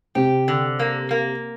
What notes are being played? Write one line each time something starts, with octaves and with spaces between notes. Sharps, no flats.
C3 G4
D3
A#3
A#3